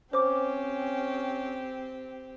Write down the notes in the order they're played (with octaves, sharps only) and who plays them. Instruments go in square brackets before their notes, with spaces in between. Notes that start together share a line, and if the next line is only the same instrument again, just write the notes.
[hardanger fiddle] C4 G4 [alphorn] C#4 [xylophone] C5 D6